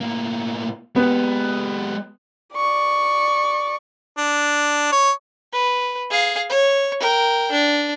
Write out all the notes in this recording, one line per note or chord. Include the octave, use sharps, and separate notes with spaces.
A2 A#3
G#3 B3 G4
D5 C#6
D4
C#5
B4
G#4 F5
C#5
A#4 G5
D4